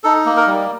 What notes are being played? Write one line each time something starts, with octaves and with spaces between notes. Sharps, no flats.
D#4 A4
A#3
A#4
G3